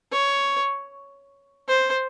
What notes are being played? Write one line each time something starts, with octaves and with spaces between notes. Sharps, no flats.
C#5
C5